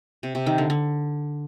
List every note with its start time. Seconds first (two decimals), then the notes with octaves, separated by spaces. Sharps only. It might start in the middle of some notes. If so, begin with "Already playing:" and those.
0.23 C3
0.35 C3
0.46 D#3
0.58 D3
0.70 D3